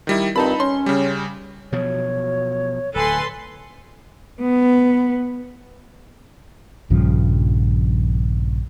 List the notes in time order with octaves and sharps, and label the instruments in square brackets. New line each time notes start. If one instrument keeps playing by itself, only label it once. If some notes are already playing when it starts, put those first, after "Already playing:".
[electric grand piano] D#3 G3 E4
[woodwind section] G2 A#2 C4 [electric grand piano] D#4 A5 B5
[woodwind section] C#4 [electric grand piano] C6
[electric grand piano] C#3 G3
[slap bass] B2 F3 F#3 [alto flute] C#5
[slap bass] D1 [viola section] A4 B4 C6 [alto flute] G#5
[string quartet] B3
[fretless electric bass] A#1 G2 C#3 F3